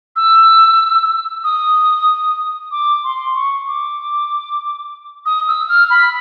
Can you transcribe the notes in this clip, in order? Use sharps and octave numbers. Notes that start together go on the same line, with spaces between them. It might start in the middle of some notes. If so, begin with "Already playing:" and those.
E6
D#6
D6
C6
C#6
D6
D#6
E6
F6
B5